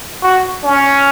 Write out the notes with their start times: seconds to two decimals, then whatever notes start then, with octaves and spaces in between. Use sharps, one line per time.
0.23 F#4
0.64 C#4